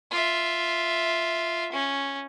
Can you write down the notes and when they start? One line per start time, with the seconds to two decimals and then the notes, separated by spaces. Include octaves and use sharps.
0.11 F4 E5
1.72 C#4